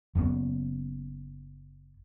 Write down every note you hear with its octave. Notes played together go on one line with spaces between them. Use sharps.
F#1 F#2 C#3 B3